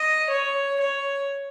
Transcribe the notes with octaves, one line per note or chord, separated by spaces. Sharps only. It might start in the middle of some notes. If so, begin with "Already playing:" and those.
Already playing: D#5
C#5
C#5